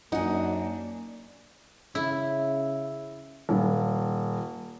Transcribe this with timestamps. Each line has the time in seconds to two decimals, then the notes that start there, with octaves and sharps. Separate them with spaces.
0.12 F#2 A#3 D4 D#4 F#5 G#5
1.95 C#3 E4
3.49 D#1